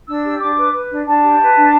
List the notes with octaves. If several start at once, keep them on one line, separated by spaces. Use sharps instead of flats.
D4 E6
G4
D4 D6
B4
B4
D4
D4 A5
G4
B4
D4